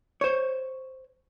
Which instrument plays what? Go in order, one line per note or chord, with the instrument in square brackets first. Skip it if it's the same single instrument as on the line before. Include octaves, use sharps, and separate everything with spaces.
[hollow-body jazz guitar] C5 C#5